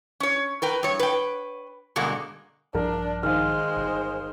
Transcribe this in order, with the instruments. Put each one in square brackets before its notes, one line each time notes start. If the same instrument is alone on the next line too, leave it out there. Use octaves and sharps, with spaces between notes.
[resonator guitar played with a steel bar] C#4 C#5
A#4 B4 G5
G2 C#5
B4 G5
G2 B2 D3 G#3 A#3
[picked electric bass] A#1 G2 F3 [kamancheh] D4 [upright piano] A#4
[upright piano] D#3 [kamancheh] G#3 C5 [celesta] F5 G#5 F6
[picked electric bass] G1